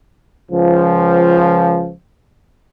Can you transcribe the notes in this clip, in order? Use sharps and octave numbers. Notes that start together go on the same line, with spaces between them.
C#2 F3